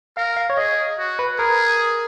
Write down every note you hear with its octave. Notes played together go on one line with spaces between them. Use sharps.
A#4 F5
F5
C#5
G#4 D#5
F#4
B4
G#4 A#4